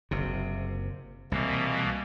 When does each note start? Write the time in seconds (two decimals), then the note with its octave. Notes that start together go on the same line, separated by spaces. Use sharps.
0.11 F#1 C3
1.32 C2 B2 E3 A#3